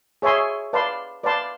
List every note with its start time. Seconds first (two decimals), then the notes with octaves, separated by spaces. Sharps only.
0.22 G#4 C#5 E5 G#5 C6
0.73 B4 D5 F5 A5 C6
1.23 B4 D5 F5 A5 C6